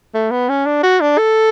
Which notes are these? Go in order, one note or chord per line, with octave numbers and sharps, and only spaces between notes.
A3
B3
C#4
D4
F#4
D4
A4